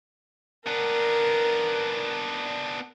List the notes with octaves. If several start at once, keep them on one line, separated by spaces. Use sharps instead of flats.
B3 D4 A#4